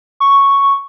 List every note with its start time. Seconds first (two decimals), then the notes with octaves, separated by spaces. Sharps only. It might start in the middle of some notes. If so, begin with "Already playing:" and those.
0.20 C#6